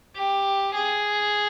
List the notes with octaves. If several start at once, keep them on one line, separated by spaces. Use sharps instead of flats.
G4
G#4